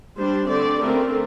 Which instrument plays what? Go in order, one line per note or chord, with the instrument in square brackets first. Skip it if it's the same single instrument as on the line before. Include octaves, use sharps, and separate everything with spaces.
[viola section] G3 D4 C5
D3 A3 C4 D5
D3 A3 C4 A#4